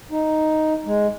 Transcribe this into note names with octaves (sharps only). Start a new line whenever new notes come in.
D#4
G#3